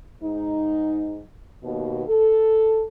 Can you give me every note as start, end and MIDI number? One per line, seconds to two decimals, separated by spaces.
0.23 1.21 44
0.23 1.21 63
1.63 2.03 39
1.63 2.03 47
2.08 2.84 69